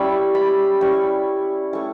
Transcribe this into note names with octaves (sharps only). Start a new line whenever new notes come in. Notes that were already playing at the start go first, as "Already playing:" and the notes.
Already playing: G3 C#4 E4 B5 C#6
B5
G3 C#4 E4 C#6
A3 C#4 E4 C#6